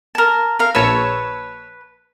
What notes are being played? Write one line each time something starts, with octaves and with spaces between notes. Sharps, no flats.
A#4 A5
A#4 F5
A#1 B4 C#5 A5 E6